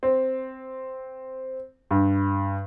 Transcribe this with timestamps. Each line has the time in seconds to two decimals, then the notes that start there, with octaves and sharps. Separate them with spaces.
0.03 C4
1.91 G2